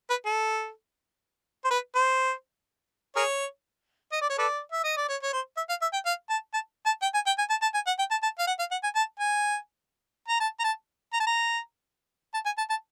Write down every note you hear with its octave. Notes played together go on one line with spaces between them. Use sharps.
B4
A4
C5
B4
C5
G#4 A#4 C#5
D#5
D5
C#5
A4 B4 D5
E5
D#5
D5
C#5
C#5
C5
E5
F5
E5
G5
F5
A5
A5
A5
G5
G#5
G5
G#5
A5
A5
G#5
F#5
G5
A5
A5
F5
F#5
F5
F#5
G#5
A5
G#5
A#5
A5
A#5
A5
A#5
A5
A#5
A5
G#5
A5
A5